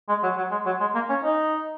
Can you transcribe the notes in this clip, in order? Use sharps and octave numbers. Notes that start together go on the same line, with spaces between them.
G#3
F#3
F#3
G#3
F#3
G#3
A#3
C#4
D#4